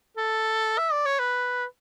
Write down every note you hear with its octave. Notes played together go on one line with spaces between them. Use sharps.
A4
E5
D5
C#5
B4